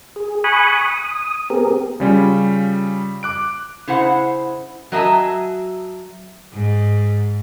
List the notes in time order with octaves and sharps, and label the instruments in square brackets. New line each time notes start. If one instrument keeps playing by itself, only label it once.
[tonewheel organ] G#4
G#5 B5 C#6 D#6 F#6
D#6
B3 C4 G4 G#4 A#4
[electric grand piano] C#3 G3 C#4 F4
D6 F#6 D7
[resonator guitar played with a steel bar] C#3 E4 C5 F#5
F#3 D#5 E5 G#5 A5
[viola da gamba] G#2